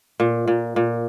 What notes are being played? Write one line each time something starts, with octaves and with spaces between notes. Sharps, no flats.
A#2
A#2
A#2